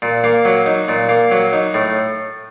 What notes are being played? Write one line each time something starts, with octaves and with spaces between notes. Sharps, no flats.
A#2
A#3
F#3
D#4
A#2
A#3
F#3
D#4
A2